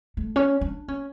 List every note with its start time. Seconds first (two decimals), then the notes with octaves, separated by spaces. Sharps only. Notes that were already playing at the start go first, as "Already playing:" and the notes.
0.17 A3
0.36 C#4
0.61 D4
0.88 C#4